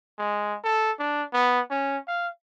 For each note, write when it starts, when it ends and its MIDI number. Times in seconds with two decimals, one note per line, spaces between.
0.19 0.57 56
0.64 0.92 69
0.99 1.25 62
1.33 1.61 59
1.70 1.97 61
2.08 2.28 77